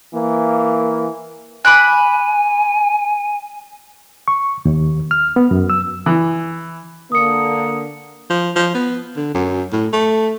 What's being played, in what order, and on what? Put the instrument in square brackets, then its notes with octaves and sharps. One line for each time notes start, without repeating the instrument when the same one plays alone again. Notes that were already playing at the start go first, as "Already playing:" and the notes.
[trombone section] E3 A#3
[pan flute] G#5 [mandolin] B5 D6 F#6
[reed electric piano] C#6
D#2
F6
B3
F#2
E6
[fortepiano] E3
[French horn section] D3 A#3 [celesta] D#6 C#7
[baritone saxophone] F3
F3
B3
D3
F#2
A2
A3